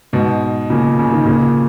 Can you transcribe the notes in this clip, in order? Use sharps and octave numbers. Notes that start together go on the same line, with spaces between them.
G#2 B2
A#2 C#3
C#3
D#3
A#2 C#3